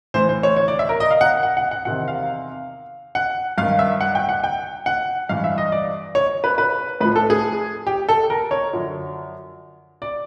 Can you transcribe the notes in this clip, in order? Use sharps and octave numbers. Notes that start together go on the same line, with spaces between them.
A2 E3 C5
C5
C#5
C#5
D5
E5
A#4
D#5
F5
F#5
F#5
F#5
F#5
E2 C3 D#3 F#5
F5
F#5
G2 D#3 F5
E5
F#5
G5
F#5
G5
F#5
G2 E3 F5
E5
D#5
D5
C#5
B4
B4
A2 F3 B4
A4
G#4
G4
A4
A#4
C#5
F#2 D3 F3
D5